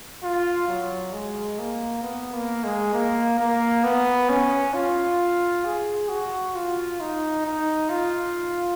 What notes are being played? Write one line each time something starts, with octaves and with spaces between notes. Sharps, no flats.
F4
F#3
G#3
A#3
B3
A#3
G#3
A#3
A#3
B3
C#4
F4
G#4
F#4
F4
D#4
D#4
F4